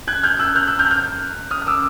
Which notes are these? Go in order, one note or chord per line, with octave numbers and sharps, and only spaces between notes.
F#6 G#6
F6 G6
E6 F#6
F6 G6
E6 F#6
F6 G6
F6 G6
D#6 F6
F6
D6 E6